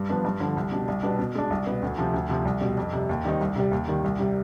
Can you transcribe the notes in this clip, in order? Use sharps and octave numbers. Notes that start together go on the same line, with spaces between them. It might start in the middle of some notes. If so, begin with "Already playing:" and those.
Already playing: G2
F3 B3 D4
G2
D3 F3
C2
B2 G3 D4
C2
B2 G3 B3 D4
B2
G#3 D4
C2
B2 B3
D2
C3 F3
D2
C3 F3
C2
B2 G3
F2
C3 G3
D#2
D#3 G3 C4 D#4
C2
C3 G3
D#2
D#3 G3
C2
C3 G3